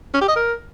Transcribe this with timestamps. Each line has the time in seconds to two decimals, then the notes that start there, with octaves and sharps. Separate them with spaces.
0.14 C#4
0.21 G4
0.29 D#5
0.36 A#4